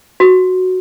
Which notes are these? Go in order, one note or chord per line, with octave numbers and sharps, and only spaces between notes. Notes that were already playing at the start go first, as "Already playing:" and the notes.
F#4